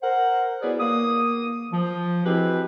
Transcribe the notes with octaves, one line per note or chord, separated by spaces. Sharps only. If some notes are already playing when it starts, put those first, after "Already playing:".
A#4 C5 F#5
F#3 B3 E4 G#4 B4 D5
A#3 D#6
F3
G#3 C4 E4 F#4 G4 B4